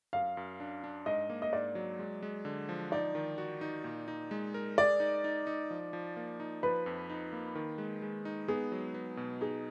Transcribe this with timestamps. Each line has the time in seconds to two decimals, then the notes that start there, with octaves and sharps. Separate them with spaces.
0.13 F#2 F5
0.37 F#2
0.60 D4
0.84 D4
1.06 G#2 D#5
1.30 A#3
1.42 D#5
1.53 G#2 D5
1.75 F#3
1.99 G#3
2.23 G#3
2.45 D3
2.69 F3
2.92 D#4 D5
3.15 D#3
3.38 F#4
3.61 D#4
3.84 A#2
4.08 D#4
4.31 G#3
4.54 A#4
4.78 G#4 D5
5.00 D#4
5.24 D#4
5.47 D#4
5.70 F3
5.93 F3
6.17 A#3
6.40 D#4
6.63 F3 B4
6.86 F2
7.10 D#4
7.32 A#3
7.55 D#3
7.78 G#3
8.02 G#3
8.25 D#4
8.48 B3 G#4
8.72 F#3
8.94 B3
9.17 B2
9.41 D#4 G#4